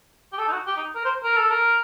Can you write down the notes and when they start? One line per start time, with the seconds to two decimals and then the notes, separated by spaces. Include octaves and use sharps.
0.33 G4
0.38 A4
0.48 D#4
0.53 F#4
0.67 G4
0.76 D#4
0.95 A#4
1.05 C5
1.24 A#4
1.37 A4
1.51 A#4